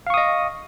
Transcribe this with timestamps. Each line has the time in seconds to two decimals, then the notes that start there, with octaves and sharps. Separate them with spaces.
0.07 F5
0.10 C#6
0.14 D#6
0.17 D#5